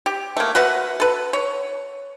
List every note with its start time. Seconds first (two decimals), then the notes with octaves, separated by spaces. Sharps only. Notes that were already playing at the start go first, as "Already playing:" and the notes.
0.06 G4
0.37 A3 A#3
0.55 F#4 B4 E5 F#5
1.00 A4 B4
1.33 C#5